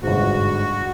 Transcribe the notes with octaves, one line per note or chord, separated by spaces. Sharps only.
G1 G#2 F#4